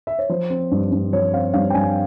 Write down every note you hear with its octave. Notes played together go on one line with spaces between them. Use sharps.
E5
C#5
F3 C5
C4
G2
G2
F3 C#5
C4 F5
G2 F5
G5
G2 G#5